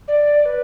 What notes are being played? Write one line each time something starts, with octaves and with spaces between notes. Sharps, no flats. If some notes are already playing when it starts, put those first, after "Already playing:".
D5
D5
B4